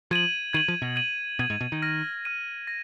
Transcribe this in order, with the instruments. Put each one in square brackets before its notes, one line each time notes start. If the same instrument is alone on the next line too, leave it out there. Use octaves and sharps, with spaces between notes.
[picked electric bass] F3 [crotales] G#6 D#7 F#7
[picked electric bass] D#3 [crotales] G#6 D#7 F#7
[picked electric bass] F3
B2
[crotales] G#6 D#7 F#7
[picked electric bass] B2 [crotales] G#6 D#7 F#7
[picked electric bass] G#2
B2
D#3
[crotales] F6 A#6 D#7
F6 A#6 D#7
A#6